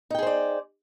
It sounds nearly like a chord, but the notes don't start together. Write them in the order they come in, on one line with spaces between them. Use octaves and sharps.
D#4 G5 G#4 C5 D5